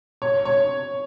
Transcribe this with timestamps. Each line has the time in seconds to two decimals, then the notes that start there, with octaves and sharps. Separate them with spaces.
0.22 C#5
0.45 C#5